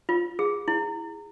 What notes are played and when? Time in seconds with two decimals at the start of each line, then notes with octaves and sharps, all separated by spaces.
0.09 F4
0.39 G#4
0.68 E4